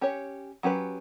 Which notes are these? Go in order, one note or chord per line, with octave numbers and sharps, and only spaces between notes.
C#4 G4 C#5
F#3 C#4 G4 B4